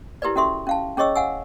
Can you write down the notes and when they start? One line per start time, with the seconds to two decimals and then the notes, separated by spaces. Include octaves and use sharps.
0.22 E4 G4 A#4 B4 D5
0.36 C#4 F#4 A4 E5 C6 C#6
0.67 C#4 F5 A5
0.97 C#4 G#4 C#5 D#5 C#6 E6
1.15 F5 F#5 G#5 E6